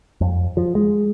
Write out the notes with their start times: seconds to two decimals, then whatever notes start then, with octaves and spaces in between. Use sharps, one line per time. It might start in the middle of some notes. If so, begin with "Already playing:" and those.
0.21 F2
0.57 F3
0.75 G#3